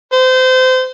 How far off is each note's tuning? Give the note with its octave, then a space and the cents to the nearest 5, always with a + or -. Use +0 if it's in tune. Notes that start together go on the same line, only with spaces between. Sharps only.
C5 -25